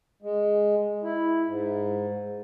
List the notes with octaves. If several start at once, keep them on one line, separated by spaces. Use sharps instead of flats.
G#3
E4
G#2